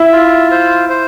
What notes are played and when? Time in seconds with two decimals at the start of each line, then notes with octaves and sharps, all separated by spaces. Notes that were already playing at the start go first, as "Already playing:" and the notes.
Already playing: E4 E5
0.12 F4
0.51 C5
0.89 C5